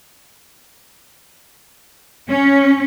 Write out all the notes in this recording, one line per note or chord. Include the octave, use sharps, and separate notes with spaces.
C#4